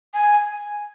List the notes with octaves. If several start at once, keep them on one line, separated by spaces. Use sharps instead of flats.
G#5